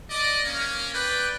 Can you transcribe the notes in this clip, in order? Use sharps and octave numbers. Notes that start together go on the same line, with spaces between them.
D5 D#5
A#3 C#4
B4 D5 G5